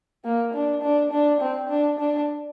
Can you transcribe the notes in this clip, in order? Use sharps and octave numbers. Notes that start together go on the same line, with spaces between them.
A#3
D4
D4
D4
C4
D4
D4